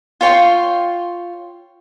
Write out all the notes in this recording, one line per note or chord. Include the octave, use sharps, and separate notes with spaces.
F4 C#5 G5 C6